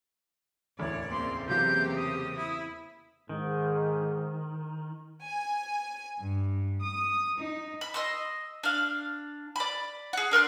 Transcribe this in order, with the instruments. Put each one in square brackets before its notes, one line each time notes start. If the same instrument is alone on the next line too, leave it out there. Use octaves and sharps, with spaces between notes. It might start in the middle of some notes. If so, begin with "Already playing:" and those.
[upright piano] E1 A1 D2 [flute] C#5 [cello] D5
[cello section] C#3 A#3 C4 [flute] C6
[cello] E2 G4 [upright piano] C3 F#3 F5 [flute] G6
[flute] D#6
[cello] E4
[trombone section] G#2 [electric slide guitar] D#3
[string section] G#5
G2
D#6
D#4
[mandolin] B5
D#5 C6 E6
D4 F5
D5 B5
G#4 F#5
D4 A#4 C6 F#6